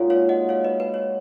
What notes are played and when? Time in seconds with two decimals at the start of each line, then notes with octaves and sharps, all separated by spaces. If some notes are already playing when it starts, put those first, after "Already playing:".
Already playing: A#2 G#3 D#4 F#4 C#5 F5
0.10 C#5 F5
0.29 D#5 F#5
0.49 C#5 F5
0.64 B4 D#5
0.80 B4
0.94 C#5